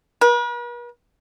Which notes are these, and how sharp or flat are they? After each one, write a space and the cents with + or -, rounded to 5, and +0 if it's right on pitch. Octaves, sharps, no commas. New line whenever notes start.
B4 -45